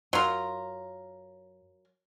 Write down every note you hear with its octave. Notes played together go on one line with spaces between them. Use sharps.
F#2 F#3 F4 A#4